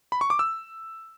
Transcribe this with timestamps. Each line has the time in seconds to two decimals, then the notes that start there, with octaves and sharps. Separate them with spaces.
0.12 B5
0.21 C#6
0.30 D6
0.39 E6